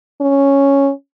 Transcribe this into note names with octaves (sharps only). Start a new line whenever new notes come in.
C#4